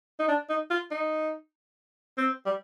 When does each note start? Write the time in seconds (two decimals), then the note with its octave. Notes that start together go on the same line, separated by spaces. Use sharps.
0.19 D#4
0.28 D4
0.49 D#4
0.70 F4
0.91 D#4
2.18 C4
2.46 G3